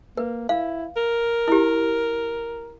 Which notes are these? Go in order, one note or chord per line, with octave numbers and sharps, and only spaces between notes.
A#3 B4
E4 F5
A#4
E4 G4